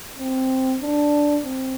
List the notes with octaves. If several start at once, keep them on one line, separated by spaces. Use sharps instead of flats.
C4
D4
C4